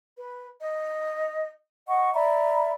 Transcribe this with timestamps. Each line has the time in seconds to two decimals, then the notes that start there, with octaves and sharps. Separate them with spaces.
0.16 B4
0.60 D#5
1.87 D#5 F#5 C#6
2.13 D5 E5 A#5 B5